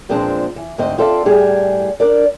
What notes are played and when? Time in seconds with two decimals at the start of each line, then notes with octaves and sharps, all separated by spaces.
0.09 E2 A#2 F3 G#3 C4 D4
0.56 E3
0.78 D2 G#2 C4 D#5
0.98 C4 F4 A4 D5 E5
1.26 A2 G3 G#4 G#5
2.00 D4 A#4 D5